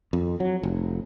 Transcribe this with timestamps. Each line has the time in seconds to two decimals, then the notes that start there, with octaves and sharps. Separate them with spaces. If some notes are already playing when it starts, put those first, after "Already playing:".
0.13 F2
0.40 F#3
0.63 F1